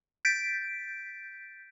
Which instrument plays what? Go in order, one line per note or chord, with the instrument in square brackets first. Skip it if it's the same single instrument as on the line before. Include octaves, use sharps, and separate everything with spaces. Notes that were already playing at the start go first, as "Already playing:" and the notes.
[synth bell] G6 A6 B6 D7